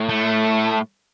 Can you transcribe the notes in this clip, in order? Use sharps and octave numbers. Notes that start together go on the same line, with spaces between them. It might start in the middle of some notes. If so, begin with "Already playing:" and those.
Already playing: A2
A3